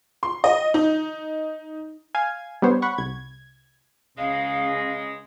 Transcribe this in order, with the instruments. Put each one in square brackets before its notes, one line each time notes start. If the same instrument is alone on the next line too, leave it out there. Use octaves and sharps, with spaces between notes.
[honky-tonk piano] C6
D#5
D#4
[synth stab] F5 G#5 G#6
G3 B3 D4 C5 C#5
F#5 B5 C#6
C2 G#6
[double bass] C#2 C#4 [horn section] C#3 G#3 [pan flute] F5